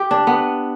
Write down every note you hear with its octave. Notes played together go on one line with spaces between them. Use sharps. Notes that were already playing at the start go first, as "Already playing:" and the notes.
Already playing: G4
D4
B3